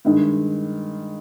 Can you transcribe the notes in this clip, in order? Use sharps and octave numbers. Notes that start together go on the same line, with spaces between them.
G2 D#3 G#3